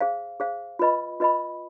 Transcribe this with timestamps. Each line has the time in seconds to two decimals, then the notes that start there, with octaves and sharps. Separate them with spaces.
0.01 G#4 C5 F5
0.40 G#4 C5 F5
0.79 F4 B4 D#5 B5
1.20 F4 B4 D#5 B5